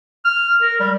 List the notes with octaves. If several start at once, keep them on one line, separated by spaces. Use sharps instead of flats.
F6
A#4
G3